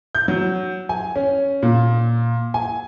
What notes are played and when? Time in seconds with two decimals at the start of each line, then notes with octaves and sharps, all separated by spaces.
0.15 G6
0.28 F#3
0.89 G#5
1.16 C#4
1.63 A#2
2.54 G#5